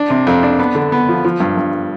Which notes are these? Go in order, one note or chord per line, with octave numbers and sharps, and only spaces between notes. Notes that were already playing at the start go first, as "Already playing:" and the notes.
Already playing: D4
C3
F2
D4
B3
D3
B3
F3
F3
G2
G2